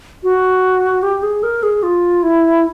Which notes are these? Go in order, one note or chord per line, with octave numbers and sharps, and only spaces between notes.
F#4
G4
G#4
A#4
G#4
F4
E4